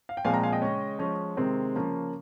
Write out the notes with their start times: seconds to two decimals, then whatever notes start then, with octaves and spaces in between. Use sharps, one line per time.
0.09 F5
0.17 G5
0.25 A#2 F3 G#3 C4 F5 G#5
0.34 G5 A#5
0.43 F5 G#5
0.52 D#5 G5
0.62 C#3 G#3 C#4
0.99 F3 G#3 C#4
1.37 C3 D#3 G#3 C4
1.74 C#3 F3 A#3 C#4